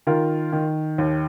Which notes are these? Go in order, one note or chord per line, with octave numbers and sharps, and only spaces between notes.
D#3 F4 A#4
D#3
D#2